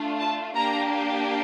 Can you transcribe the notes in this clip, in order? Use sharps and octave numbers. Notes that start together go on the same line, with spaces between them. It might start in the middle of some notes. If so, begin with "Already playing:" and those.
Already playing: A3 D4 F4
A5
A#3 D4 G4 A#5